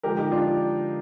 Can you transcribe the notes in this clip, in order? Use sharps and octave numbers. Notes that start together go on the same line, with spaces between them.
D3 F3 G#3 G4 A#4
D#4 G4
D4 F4